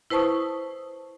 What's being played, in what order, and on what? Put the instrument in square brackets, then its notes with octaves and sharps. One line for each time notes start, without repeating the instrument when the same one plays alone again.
[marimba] E4 B4 C5 A5 C#6 D#6